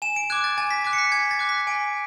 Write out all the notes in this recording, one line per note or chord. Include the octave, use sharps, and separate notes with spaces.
G#5 E7
D7
D6 F#6 G#6
A6
G#5 A6
B6
D6 F#6 B6
C#7
B6
G#5 G#6
A6
D6 F#6
B6
G#5 D7